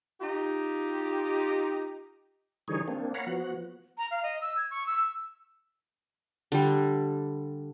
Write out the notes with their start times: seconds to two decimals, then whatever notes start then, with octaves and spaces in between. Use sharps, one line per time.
0.21 D#4 F4 G4
2.68 D3 E3 G3 D#4 G#4 C#5
2.88 A#3 C4 D4
3.14 C#5 F5 F#5 A#5 B5
3.27 F3 B3 F#4 F#6
3.98 A#5
4.11 F5
4.23 D#5
4.41 E6
4.57 G#6
4.71 C#6
4.86 E6
6.52 D3 G3